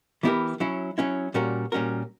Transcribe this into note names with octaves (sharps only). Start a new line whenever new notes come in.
E3 B3 E4 G4 A#4
F#3 C#4 E4
F#3 C#4 E4
A#2 G3 C#4 F#4 A#4
A#2 G3 C#4 F#4 A#4